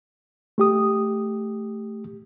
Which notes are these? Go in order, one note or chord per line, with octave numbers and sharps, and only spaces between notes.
A3 G4 D#6